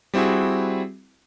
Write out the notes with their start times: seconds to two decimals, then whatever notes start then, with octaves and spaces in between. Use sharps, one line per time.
0.14 G3 C4 E4 F#4 G#4